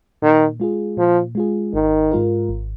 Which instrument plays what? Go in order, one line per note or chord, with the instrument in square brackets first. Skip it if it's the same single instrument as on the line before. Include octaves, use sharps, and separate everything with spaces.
[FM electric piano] A#2 [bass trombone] D#3
[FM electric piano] G#3 F4 G#4
[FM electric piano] A#2 [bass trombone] F3
[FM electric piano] G#3 F4 G#4
[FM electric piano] G#1 [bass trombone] D#3
[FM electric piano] G#2 G#3 F4 A#4
G#1